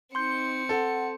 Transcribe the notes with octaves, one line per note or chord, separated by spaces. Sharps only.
C4 D#4 C6 G6 C#7
A4 F#5